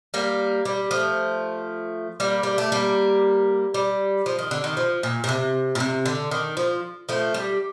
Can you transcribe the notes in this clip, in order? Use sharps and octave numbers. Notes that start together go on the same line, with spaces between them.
G3 A#3
G3
F3 A3
G3 A#3
G3
A3
G3 A#3
G3
F3
D#3
D3
D#3
F3
A#2
A#2
C3
A#2
C3
D3
D#3
F3
F3 A3
G3